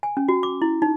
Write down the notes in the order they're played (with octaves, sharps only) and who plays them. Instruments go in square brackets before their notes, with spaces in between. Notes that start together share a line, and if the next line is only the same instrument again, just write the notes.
[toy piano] G#5
C#4
F#4
D6
E4
D#4